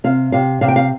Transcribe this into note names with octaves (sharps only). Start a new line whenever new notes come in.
C3 F5
C3 F5
C3 F5
G5
F5